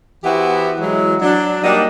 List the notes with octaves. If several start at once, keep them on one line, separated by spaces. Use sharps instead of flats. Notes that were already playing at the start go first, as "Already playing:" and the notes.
E3 B3 E4 F#4 G4 C5
E3 F#3 G#3
F#3 D4
F#3 G3 A#3 D4 D#4